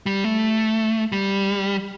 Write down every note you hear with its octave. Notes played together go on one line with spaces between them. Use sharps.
G3
A3
G3